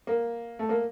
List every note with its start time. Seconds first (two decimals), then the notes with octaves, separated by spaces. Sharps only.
0.07 A#3
0.59 A3
0.69 A#3